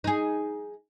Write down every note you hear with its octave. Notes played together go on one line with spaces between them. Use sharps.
D#4 G#4